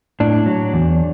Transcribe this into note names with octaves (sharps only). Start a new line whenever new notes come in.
A2 D4
F#3
E2